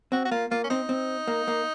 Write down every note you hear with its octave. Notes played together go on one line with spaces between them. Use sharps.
C4 F#4
F#4
A#3 F4
A#3 F4
C#4
C4 D#4
C4
A#3
A#3